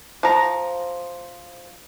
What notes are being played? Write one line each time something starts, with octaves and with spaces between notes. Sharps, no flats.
F3 A#5